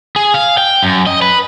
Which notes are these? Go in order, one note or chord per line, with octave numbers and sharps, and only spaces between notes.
G#4
F5
G5
F#2
D#5
B4